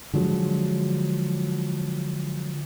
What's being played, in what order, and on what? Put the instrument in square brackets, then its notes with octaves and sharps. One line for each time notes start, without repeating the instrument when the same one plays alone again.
[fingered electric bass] D3 F3 F#3 G#3